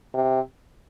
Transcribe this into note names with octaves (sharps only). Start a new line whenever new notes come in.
C3